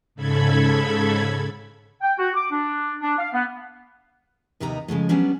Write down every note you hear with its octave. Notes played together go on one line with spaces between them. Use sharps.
G#2 C#3 A4 B5 G#6
G5
F#4
D6
D4
D4
F5
B3
D#2 C3 B3 D#4 A#5
C#3 F3 G#3 A3
F#3 G3 B3 C#4 D4